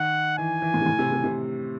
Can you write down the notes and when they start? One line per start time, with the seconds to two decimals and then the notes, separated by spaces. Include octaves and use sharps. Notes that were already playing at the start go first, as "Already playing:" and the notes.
Already playing: D#3 F#5
0.38 E3 G#5
0.62 E3
0.74 A2
0.81 C3
0.86 A2
0.99 C3
1.12 C3
1.24 C3